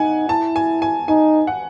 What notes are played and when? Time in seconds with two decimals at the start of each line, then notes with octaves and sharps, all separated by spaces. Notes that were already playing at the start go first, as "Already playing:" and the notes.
Already playing: D#4 F#5 G#5
0.29 E4 A5
0.56 G#5
0.82 G#5
1.08 D#4 G#5
1.47 F#5